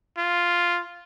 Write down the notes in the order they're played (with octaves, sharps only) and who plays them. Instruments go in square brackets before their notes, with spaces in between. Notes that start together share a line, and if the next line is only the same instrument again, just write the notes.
[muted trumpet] F4